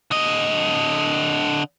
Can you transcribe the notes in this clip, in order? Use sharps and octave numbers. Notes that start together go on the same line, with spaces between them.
D3 D#5